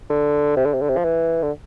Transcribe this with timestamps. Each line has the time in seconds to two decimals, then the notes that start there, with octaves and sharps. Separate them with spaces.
0.10 D3
0.57 C3
0.65 D3
0.74 C3
0.82 D3
0.89 C3
0.97 F3
1.04 E3
1.43 D3